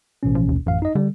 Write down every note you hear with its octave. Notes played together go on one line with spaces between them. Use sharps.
A1 B2 C#4
F3
D#2
A1 F#2 F5
D#4 D#5
D3 G3